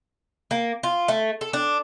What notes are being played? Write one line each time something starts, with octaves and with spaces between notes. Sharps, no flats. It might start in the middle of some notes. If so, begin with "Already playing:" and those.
A#3
F4
A3
A4
D4